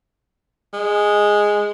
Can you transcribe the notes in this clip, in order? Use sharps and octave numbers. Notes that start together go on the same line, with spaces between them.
G#3